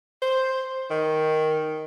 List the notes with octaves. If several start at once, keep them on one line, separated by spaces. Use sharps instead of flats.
C5
D#3